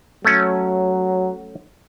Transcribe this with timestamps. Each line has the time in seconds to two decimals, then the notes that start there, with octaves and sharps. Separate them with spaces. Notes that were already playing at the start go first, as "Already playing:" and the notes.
0.25 F#3 A3 C#4